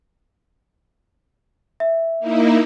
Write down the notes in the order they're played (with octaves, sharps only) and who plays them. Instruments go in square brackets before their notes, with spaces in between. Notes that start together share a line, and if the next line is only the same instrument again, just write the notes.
[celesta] E5
[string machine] A#3 D#4 E4